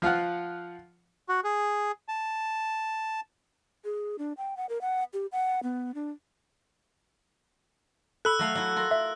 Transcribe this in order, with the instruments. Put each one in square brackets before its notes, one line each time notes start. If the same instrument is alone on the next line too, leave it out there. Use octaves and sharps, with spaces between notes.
[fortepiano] F3 F4 F5 F#5
[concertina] F#4
G#4
A5
[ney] G#4
D4
G5
F#5
A#4
F#5
G4
F#5
B3
D4
[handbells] A4 B5 [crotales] E6 F#6
[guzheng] F#3 A3 F5
F#3 E4
F4 A#4
[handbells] E5